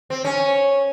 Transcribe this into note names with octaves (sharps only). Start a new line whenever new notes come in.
C4
C#4